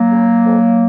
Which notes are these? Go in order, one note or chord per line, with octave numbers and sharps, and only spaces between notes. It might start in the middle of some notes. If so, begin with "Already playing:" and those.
Already playing: F#3 A#3
C#3
F2